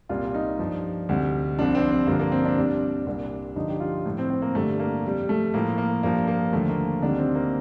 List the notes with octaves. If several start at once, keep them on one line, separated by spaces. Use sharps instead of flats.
C2 A#2 G3 F4
D#4
G2 F3
D2 C3 G3
C2 C3 F3 D4
C4
C4
G2 D3 F3 A#3
A#3
C4
D4
C2 C3 G3
C2 A#2 G3
G2 D3 F3 D#4
G4
F4
A2 F3
C4
C4
A#3
G2 D3 G3 A3
A#3
F2 C3 G3
A3
A2 F3 A#3
A#3
G2 F3 A#3
A#3
D#2 D3 F3 A3
A#3
D2 C3 D#3 G3 D4
C4
A#3